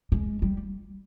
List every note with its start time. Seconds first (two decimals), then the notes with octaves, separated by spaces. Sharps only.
0.12 G#3
0.42 G3